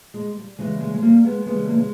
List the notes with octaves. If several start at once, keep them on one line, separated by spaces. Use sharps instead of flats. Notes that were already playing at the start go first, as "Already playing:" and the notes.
G#3
G3
C#3 E3 G3 G#3
G#3
G#3
G3 A#3
G#3 B3
C#3 E3 G3 G#3 B3
A#3
G#3